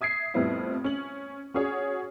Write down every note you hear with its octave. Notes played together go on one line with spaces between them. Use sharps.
E5 D#6 G#6 B6 C7
F2 A2 G3 B3 C4 E4
C#4 F#7
C#4 F#4 G#4 C#5